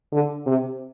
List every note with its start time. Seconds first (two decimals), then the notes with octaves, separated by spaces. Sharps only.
0.12 D3
0.46 C3